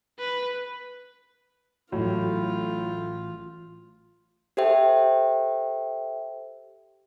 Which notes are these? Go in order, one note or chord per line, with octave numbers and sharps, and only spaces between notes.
B4
A1 A2 F#3 F4
G4 A4 C5 E5 G5